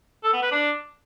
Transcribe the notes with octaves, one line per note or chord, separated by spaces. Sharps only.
A4
B3
B4
D4